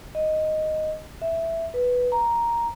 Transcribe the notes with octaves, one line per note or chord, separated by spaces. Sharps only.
D#5
E5
B4
A#5